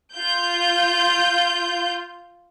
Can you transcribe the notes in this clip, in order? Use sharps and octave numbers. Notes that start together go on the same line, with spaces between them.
F4 G6